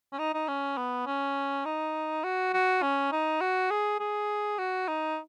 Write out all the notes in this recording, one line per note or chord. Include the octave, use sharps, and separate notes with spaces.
C#4
D#4
D#4
C#4
B3
C#4
D#4
F#4
F#4
C#4
D#4
F#4
G#4
G#4
F#4
D#4